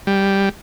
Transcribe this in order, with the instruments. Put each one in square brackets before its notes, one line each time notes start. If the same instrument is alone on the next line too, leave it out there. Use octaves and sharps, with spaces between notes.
[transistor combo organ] G3